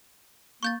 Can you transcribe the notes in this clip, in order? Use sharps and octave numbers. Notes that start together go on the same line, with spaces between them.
A#3 C#6 G6 A6